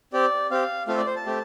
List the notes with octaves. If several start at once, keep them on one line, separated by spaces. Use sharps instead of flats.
C4 G4 D5
C4 G4 F5
A3 C4 F4 A4 F5
D5
C5
A5
A3 C4 G4